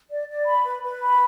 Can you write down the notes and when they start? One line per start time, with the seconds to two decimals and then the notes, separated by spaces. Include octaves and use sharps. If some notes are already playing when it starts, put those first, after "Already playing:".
0.10 D5
0.28 D5
0.46 B5
0.64 B4
0.82 B4
1.01 B5